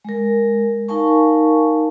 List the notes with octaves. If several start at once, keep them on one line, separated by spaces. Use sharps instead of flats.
G#3 A#4
D#4 A#4 F5 G#5 A5 C#6